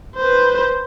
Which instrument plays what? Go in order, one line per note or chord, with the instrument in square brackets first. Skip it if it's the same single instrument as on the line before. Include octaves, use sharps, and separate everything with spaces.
[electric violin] B4 C5